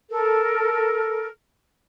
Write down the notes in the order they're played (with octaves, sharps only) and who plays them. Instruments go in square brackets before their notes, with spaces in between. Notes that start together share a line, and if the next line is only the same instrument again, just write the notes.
[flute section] A4 A#4